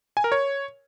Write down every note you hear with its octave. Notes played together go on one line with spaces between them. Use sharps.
G#5
A#4
C#5